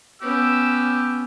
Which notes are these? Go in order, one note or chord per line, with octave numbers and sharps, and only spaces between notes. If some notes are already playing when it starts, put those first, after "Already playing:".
B3 C#4 G4 E6